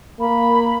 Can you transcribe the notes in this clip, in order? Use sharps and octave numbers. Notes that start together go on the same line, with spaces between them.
A#3 B5